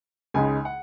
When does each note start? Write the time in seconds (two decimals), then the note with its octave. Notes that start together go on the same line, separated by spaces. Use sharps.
0.34 C#2 C#3 G#3 D#4 G#5
0.65 F#5